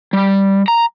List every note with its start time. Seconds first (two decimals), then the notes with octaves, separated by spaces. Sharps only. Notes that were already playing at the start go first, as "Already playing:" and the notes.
0.13 G3
0.68 A#5